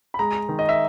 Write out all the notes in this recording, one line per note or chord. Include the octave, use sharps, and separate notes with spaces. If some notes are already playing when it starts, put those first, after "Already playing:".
B5
G#3 A#5
D#3
D#5
E5